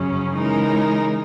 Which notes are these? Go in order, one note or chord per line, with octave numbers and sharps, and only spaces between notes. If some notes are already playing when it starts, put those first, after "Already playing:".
Already playing: F#2 C#3 F#3 C#4
C#3 E3 G#3 D#4 A#4